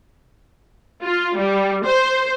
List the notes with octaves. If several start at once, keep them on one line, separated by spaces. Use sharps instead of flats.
F4
G3
C5